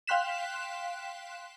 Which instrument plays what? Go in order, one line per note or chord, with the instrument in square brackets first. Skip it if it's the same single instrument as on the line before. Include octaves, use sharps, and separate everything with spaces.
[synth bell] F5 G5 C6 F#6 B6 E7